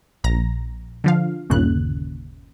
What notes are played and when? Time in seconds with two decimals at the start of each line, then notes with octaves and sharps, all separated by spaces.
0.24 A#1 A#5 A#6
1.04 D3 F3 F5
1.50 G1 D#2 A#2 C#3 F#6